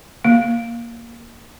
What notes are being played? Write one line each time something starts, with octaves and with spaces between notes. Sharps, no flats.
A#3